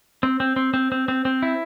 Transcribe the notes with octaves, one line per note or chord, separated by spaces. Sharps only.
C4
C4
C4
C4
C4
C4
C4
E4